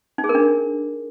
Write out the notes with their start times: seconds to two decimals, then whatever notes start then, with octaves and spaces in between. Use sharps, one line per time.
0.18 D#4
0.24 G#4
0.29 A#4
0.35 D4